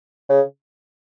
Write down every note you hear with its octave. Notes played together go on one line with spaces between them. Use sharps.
C#3